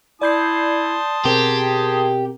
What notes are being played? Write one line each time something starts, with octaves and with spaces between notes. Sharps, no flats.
E4 D5 A5 C6 D#6 G6 C7
B2 C4 G4 G#4 A#4